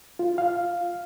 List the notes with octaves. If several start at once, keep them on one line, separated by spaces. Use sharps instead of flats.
F4
F5